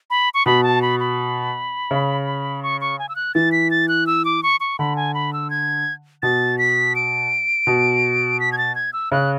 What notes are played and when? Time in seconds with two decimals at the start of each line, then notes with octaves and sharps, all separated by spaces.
0.10 B5
0.34 C#6
0.46 B2 B5
0.64 A5
0.82 B5
1.00 B5
1.91 C#3
2.63 C#6
2.81 C#6
2.99 G#5
3.09 E6
3.16 F#6
3.35 E3 A6
3.52 B6
3.71 A6
3.88 F#6
4.07 E6
4.25 D6
4.43 C#6
4.60 C#6
4.79 D3 B5
4.96 G#5
5.14 B5
5.33 E6
5.50 G#6
6.22 B2 A6
6.58 B6
6.96 D7
7.67 B2
8.40 B6
8.52 G#6
8.58 A6
8.75 G#6
8.93 E6
9.12 C#3 F#6